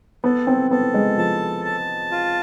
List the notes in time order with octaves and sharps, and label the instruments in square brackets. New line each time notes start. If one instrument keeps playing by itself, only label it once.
[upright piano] B3 [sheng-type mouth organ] A4
[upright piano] C4
[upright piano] B3 [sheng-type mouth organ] A4
[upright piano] G#3
[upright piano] F3 [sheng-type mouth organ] A5
[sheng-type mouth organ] A5
F4